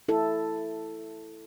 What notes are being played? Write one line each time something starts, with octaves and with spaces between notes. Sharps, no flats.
E4 A4